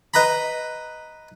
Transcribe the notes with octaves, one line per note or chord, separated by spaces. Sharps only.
B4 D#5 A#5 B5